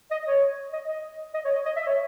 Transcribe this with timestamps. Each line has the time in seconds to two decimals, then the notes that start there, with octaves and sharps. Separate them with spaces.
0.11 D#5
0.27 C#5
0.73 D#5
0.88 D#5
1.34 D#5
1.45 C#5
1.55 D#5
1.65 D#5
1.76 E5
1.86 C#5